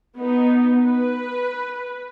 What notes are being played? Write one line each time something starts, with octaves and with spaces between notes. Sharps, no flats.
B3 D#4
B4